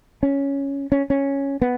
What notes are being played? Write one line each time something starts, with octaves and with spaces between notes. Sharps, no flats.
C#4
C#4
C#4
B3